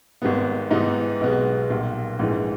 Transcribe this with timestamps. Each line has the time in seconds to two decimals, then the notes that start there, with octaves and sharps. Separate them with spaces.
0.22 G#1 G#2 G3 B3
0.71 G#2 E3 G3 B3 D#4
1.21 B1 B2 G#3 B3
1.70 B1 A#2 G3
2.19 A#1 G#2 E3 G#3